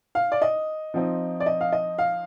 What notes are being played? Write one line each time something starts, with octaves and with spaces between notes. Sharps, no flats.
F5
D5
D#5
F3 C4 D#4
D5
D#5
F5
D#5
F5